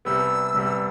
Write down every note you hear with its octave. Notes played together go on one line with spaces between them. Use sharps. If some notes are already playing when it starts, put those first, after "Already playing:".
C2 C3 G3 B3 E6
C2 C3 G3 B3